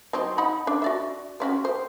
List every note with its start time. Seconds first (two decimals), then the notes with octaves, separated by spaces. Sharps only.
0.13 F#3 C4 D#4
0.38 D#4 F#5 B5
0.67 D4
0.82 F#4 D5 E5
1.40 C4 C#4 F#4
1.64 C4 C5